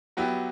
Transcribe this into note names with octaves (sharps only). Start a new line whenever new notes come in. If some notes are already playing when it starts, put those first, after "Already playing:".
F#3 B3 E4 G4